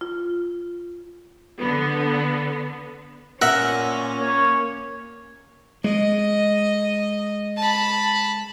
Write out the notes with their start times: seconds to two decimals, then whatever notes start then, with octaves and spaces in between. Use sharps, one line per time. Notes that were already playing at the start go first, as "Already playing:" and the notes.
0.01 F4
1.60 D3 B3
3.42 A#2 C#4 A#4 E5 F#5
4.20 A#3 C#5
5.84 G#3 D#5
7.57 A5 B5